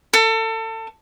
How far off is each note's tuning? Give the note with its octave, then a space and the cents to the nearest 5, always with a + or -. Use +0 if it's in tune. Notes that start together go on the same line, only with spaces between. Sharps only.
A4 +30